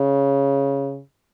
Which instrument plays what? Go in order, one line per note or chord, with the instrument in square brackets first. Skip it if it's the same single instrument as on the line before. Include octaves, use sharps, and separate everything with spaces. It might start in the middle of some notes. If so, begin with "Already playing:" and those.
Already playing: [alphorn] C#3